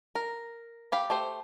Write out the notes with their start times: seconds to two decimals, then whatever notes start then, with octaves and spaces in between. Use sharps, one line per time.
0.15 A#4
0.92 G4 F5 B5
1.10 A3 G4 C5